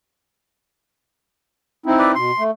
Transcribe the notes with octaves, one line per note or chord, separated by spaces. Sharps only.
C4 D#4 E4
B4 D5
B2 C6
A3